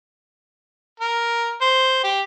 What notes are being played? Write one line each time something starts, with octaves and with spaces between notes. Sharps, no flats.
A#4
C5
G4